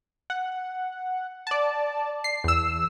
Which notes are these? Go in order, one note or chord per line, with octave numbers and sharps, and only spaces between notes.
F#5
D5 A5
C7
E2 E6